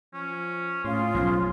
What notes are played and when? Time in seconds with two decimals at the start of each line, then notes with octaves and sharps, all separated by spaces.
0.14 F3 C#4
0.84 A2 C#4 F4 G#4 C6
1.14 B1 F3